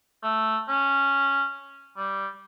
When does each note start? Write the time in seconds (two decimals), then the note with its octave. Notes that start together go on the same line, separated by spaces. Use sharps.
0.23 A3
0.68 C#4
1.97 G3